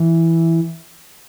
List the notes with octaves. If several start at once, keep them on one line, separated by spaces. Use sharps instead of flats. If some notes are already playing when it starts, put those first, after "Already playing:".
Already playing: E3